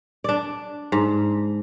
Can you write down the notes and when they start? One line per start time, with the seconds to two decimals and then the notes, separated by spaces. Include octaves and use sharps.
0.24 D4 D5
0.92 G#2